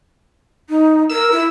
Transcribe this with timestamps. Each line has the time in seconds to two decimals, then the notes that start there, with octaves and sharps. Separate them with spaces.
0.69 D#4
1.10 A#4 E6
1.32 E4